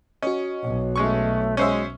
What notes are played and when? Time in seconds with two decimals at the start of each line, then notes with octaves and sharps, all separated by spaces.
0.22 C#4 F#4 C#5 D#5
0.63 B1
0.96 G#3 A3 C#4 C#6
1.57 G#3 C#4 C5 E5